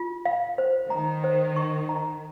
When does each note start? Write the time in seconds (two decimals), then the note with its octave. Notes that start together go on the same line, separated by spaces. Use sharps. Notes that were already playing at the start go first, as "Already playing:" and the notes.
Already playing: F4
0.25 F5
0.58 C5
0.90 D#3 A#5
1.24 C5
1.56 C#6
1.89 A#5